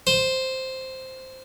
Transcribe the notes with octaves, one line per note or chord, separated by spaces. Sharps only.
C5